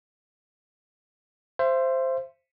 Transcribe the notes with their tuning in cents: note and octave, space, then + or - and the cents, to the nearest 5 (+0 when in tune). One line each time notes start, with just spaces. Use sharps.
C5 +0 E5 +35